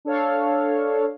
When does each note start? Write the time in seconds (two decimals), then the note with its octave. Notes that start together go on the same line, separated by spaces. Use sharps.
0.05 D4 A4 C#5 F5